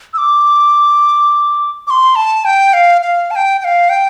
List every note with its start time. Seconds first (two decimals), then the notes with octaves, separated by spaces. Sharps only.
0.14 E6
0.18 D6
1.87 D6
1.90 C6
2.16 A5
2.45 G5
2.73 F5
3.02 F5
3.31 A5
3.36 G5
3.60 G5
3.64 F5
3.89 G5